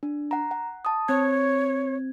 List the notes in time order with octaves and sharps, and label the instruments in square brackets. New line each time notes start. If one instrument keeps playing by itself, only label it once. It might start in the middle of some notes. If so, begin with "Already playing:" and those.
[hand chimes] D4
F#5 A#5
F#5
A5 D#6
[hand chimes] C4 G#6 [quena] C#5